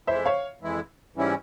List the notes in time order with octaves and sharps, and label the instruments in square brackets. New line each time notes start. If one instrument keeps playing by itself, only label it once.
[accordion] F2 E3 G#3 E4 [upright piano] C5 E5
[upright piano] C#5 F5
[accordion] F2 E3 G#3 E4
G#2 E3 G3 C#4 E4